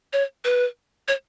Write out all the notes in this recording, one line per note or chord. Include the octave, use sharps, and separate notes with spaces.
C#5
B4
C#5